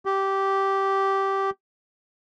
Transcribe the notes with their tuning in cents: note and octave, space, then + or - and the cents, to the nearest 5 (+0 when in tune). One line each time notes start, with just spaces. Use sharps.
G4 -10